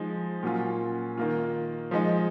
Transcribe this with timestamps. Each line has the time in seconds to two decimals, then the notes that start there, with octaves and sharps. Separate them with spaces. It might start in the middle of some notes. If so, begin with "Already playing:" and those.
Already playing: F3 G#3 D#4
0.43 A#2 F#3 C#4 F4
1.17 D#3 A#3 F4
1.91 F3 G#3 D#4